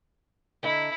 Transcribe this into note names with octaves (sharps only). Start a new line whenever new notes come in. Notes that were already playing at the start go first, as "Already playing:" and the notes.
D3 E4 D#5 A#5